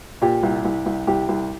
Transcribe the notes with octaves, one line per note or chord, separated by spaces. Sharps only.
A#2 G4
C2
C2
C2
C2 G4
C2